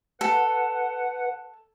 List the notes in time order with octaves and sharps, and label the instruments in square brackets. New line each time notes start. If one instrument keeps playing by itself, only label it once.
[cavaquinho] A4 [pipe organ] B4 F#5